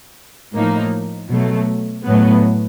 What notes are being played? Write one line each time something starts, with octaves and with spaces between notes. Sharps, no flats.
A2 F3 A#3 D#4
B2 F#3 A3
A2 F#3 B3